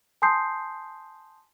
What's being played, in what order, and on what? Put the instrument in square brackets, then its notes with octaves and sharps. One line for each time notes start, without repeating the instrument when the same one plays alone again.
[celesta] G#5 A5 C6 D#6 G6 C7